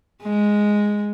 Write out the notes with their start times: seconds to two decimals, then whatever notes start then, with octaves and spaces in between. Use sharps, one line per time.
0.23 G#3